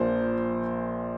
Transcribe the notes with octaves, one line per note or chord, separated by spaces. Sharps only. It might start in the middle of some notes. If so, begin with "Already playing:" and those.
Already playing: A#1 A#2 F3 A#3 C5